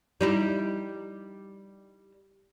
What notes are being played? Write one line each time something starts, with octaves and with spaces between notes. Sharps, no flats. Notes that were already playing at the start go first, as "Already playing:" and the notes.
G3 D#4 E4